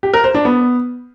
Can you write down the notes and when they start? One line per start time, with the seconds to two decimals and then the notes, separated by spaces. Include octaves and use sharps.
0.03 G4
0.14 A#4
0.24 C5
0.35 D4
0.45 B3